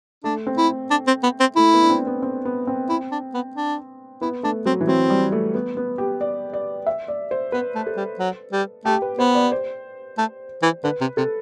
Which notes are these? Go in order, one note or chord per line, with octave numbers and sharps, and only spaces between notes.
A3 D4
C4
E4
D4
C4
B3
C4
A3 E4
B3
D4
C4
B3
C4
B3
C4
E4
D4
B3
D4
B3 E4
A3 D4
F#3 C4
E3
F#3 C4
G3
A3
B3
B3
G4
D5
D5
E5
D5
C5
B3 B4
A3
A4
G3
F#3
G3
A3 G4
B4
B3 C5
D5
C5
A3
E3
D3 B4
C3
C3 A4